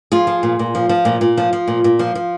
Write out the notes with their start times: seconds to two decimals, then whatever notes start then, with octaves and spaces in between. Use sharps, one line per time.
0.12 F3 F4 G#4
0.27 F3
0.43 A#2
0.59 A#2
0.75 F3
0.89 F3
1.05 A#2
1.21 A#2
1.38 F3
1.53 F3
1.68 A#2
1.84 A#2
1.99 F3
2.15 F3